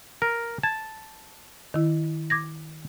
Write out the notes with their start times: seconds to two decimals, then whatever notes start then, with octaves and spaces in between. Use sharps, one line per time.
0.22 A#4
0.63 A5 G#6
1.74 D#3 E4
2.30 D6 G#6 A#6